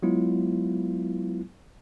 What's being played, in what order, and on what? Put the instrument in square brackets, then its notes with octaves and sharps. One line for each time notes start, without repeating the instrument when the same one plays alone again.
[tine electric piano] F#3 G#3 B3 E4 F4